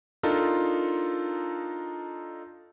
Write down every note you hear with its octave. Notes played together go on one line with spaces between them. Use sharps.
D4 D#4 F4 A4 A#4